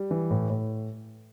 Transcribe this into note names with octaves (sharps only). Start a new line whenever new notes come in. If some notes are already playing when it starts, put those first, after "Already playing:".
Already playing: G3
E3
A2
A2